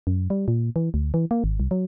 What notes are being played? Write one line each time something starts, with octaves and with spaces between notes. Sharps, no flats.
F#2
G3
A#2
E3
D2
E3
A#3
G#1
C2
F#3